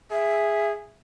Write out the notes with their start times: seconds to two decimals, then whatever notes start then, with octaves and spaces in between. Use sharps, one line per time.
0.11 G#4 E5